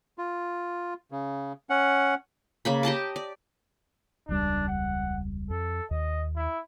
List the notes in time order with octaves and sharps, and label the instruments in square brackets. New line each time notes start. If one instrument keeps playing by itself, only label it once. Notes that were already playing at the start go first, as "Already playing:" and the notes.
[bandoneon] F4
C#3
C#4 F#5
[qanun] C#3 A#3 B5
G4 D#5 A5 D6
D5
[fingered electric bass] E1 C#2 G3 [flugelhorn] D4
[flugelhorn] F#5
[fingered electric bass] F2 [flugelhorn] A4
[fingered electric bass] D#2 [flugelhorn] D#5
[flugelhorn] E4